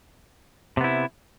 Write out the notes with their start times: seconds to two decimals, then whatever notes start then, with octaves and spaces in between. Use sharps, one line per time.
0.77 C3
0.81 B3
0.84 E4